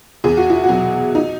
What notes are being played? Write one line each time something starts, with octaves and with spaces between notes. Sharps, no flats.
E2 G#4
F#4
E4
F#4
B2 F#3
D#4